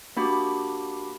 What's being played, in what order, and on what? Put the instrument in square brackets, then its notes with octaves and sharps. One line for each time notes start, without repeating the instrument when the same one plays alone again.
[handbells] A#3 D4 F#4 G4 B5 D6